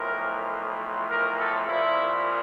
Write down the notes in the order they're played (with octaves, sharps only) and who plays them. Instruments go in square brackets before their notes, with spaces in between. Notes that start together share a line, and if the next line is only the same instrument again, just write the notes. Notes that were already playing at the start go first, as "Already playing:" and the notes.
Already playing: [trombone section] B1 A2 F3 A#4
A#4
A4
C2 A#2 F3 E4